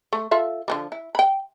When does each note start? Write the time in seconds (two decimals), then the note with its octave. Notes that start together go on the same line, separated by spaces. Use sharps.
0.13 A3
0.31 F4 A4 E5
0.68 D3 F3 G3
0.92 E4
1.15 G5 B5